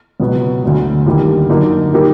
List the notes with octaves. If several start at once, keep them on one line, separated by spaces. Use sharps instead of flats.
C#2 B2 F#3 B3
D2 D3 F#3
D#2 D3 G3 A#3 D#4
F#2 D3 F#3 A#3 D#4
G3 A#3 D#4 G4 A#4